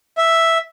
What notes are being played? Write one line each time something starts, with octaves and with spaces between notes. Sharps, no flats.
E5